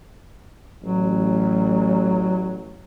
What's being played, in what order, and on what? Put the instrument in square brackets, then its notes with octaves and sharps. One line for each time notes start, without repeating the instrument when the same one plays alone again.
[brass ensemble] A1 [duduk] F#3